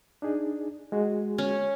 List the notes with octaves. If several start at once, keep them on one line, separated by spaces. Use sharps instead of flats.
D4 D#4 G#4
G#3 F#4 G#4
C#4